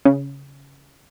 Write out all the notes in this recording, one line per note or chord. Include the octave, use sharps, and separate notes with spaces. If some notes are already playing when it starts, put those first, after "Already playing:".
C#3